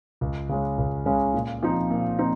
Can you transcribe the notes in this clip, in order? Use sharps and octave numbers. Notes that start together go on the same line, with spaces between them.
C#2
C#3 G#3 C#4
C#2
C#3 G#3 C#4
A#2
F3 C4 D#4
A#2
F3 C4 D#4